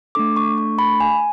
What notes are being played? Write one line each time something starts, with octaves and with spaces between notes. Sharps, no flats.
A3 D4 A4 D6
C#6
C#6
B5
G#5